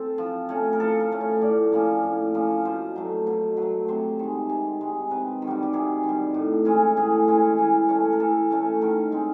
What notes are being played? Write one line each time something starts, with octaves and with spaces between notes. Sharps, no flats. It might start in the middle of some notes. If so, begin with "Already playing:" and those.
Already playing: C4 A4
F3
A3 C#4
A#4
F3 A4
A#4
A3 C#4
C#5
A2 D5
F3 A#3 C#4
A2
F3 A#3 C#4
B2 C5
F#3 A3
B2
F#3
A3
C3 C5
D#3 G#3
C3
D#3 G#3
C3 B4
D#3
G3 F#4
G4
C3 G#4
D#3
G3
A2
E3 G#3 C#4
A2 G#4
E3 G#3 C#4
E3
A3 C#4
A#4
E3 A4
A3 C#4
D#3 A#4
G#3 C4